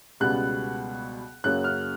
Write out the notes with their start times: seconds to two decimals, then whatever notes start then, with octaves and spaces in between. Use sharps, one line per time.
0.20 C#2 B2 G3 B3 F#6
1.44 F#2 C#3 F#3 A#3 F#6
1.64 F6